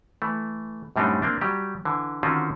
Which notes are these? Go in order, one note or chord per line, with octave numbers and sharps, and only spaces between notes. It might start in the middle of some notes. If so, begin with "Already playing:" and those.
E3 A3
F#2 A2 G3 C4 D4 D#4
A#3 C4 D4
F#3 G3 G4
D3 E3
D3 D#3 C4 C#4 F4 F#4